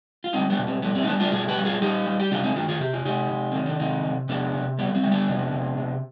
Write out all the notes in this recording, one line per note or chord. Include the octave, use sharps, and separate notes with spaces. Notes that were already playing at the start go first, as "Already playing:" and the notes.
F4
G3 C4 D#4
B3 D4
B2
C4
G3 B3
C4
D#4
G3 B3 D4
D4 F4
B2 F4 G#4
G4 B4
G3
F4 G#4
G3 D#4 G4
G3
G4
C3 D4 F4
C4 D#4
D#3 D4 F4
F4 G#4
C3 G4
F4
C3 D#4 G4
C3
D#3 C4
D4
C3 C4 D#4
C3
C3 B3 D4
C3
G3 B3
C4
G3
B3 D4
C3
C3
C3